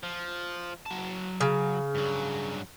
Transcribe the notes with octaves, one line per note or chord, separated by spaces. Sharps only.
F3
F#3 A5
C#3
G2 F#3